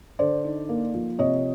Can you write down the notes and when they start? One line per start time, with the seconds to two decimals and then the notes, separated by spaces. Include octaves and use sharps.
0.19 D3 C5 D5
0.44 D#4
0.69 A#3
0.94 F3
1.19 C3 C#5 D#5